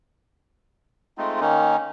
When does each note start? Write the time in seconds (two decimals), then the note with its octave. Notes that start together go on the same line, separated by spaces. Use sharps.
1.18 G#3 A3 C4 D#4 F4
1.41 D#3 A#3 C#4 D#4